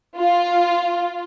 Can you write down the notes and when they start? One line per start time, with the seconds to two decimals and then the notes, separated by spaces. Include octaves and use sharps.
0.17 F4